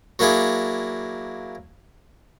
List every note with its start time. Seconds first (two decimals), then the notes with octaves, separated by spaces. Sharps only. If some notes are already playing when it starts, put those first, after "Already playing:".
0.19 F#3 A#3 D4 E4 G#4